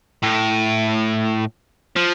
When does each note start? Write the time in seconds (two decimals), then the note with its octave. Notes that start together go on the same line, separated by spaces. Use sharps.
0.23 A2
1.96 F3